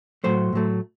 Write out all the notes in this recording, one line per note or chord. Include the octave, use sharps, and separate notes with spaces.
A2 F#3 A3 C5
A2 F#3 A3